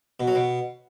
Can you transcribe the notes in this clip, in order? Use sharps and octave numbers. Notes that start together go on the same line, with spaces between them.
B2
F#3
B2